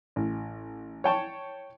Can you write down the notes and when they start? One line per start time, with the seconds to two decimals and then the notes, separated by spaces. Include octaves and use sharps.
0.16 A1
1.04 C#5 G5 A5 C#6